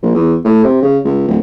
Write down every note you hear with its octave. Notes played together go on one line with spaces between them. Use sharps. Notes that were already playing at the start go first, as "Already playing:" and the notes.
A#1
E2
A2
C3
C#3
C#2
D1